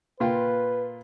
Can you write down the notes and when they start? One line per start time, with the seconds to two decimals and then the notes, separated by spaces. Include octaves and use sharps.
0.20 A#2 F4 B4 G5